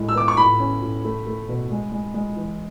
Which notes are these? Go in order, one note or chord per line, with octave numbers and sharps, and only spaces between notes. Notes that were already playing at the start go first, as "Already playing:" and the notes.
Already playing: A2 G#3
E6
B3 D6
C#6
A2 B5
C#4
A2
A3
A3
B2
G#3
G#3
G#3
E3